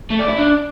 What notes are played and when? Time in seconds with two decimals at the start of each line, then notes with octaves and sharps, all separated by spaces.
0.11 A3
0.20 D5
0.29 E4
0.38 D4